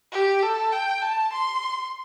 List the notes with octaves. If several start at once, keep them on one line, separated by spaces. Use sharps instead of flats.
G4
A4
G5
A5
C6